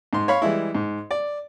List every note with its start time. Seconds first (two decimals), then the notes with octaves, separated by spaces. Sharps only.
0.13 G#2 C6
0.28 C#5 F5 B5
0.42 E3 G3 G#3 E4
0.75 G#2
1.11 D5